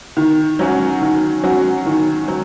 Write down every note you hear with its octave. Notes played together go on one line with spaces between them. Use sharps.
D#3
F#3 C#4 F#4
D#3
F#3 C#4 F#4
D#3
F#3